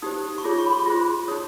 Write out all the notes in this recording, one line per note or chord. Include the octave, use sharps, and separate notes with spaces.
D#4 G4 C5 D#6
C#6
F4 G#4 C#5 D6
C#6
B5
C6
F4 G#4 C5
D#4 G#4 C#5 D#6